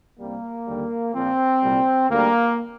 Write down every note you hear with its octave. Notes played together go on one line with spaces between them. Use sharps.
C2 C3 G3 A#3
D#2 D3 G3
A#1 A#2 F3 C4
C2 A#2 G3
D2 D3 G3 A#3